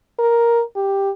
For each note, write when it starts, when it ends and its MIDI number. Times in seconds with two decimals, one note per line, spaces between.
0.19 0.63 70
0.76 1.10 67